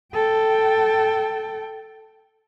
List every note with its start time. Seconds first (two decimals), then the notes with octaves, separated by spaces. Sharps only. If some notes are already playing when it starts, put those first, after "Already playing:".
0.13 A4 G5